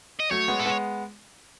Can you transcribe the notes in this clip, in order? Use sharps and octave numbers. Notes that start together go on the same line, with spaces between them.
D#5
F#3 A3 C#5
G#3 B3
A4
G#3 B3